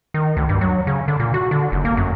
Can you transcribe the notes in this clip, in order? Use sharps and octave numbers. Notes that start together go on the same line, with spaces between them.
D#3
D2
G2
F#3
C#3
D3
A#2
F#4
D3
F#1
A#3
F#2